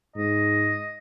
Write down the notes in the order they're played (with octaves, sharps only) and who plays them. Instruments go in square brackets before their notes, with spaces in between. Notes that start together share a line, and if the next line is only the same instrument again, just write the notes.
[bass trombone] G#2 [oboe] D#5